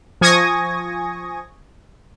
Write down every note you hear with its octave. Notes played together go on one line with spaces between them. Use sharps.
F3 G#5 C#6 D#6 G#6 A#6